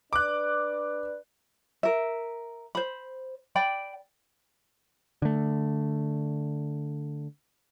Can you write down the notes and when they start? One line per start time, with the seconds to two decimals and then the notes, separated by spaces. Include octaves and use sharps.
0.13 D4 B4 D5 D6 F#6
1.83 A#4 E5
2.75 C5 B5
3.55 D5 G5 B5
5.22 D3 A3